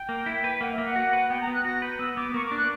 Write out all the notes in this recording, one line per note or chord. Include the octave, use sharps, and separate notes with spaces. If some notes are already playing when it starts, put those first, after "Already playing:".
Already playing: G5
A#3
E4
B4
A#3 F#5
E5
A#3
F#5
F#4
B4
B3 G5
A#5
B3
F#6
F#4 A#6
B4 G6
B3 E6
B3 D6
A#3 C#6
D6
D4
F#6